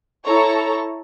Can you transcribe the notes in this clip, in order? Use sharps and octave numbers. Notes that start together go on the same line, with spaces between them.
E4 A4 C#5 A#5 C#6